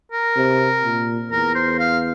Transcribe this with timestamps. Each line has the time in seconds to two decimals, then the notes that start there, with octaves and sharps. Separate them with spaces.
0.12 A#4
0.36 C3
0.84 A#2
1.31 E2 A#4
1.55 C5
1.79 F5